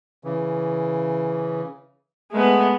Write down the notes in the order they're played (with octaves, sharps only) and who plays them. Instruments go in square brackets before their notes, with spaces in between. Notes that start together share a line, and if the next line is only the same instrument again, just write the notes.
[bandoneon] C#3 E3
[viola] G#3 B3 [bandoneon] A3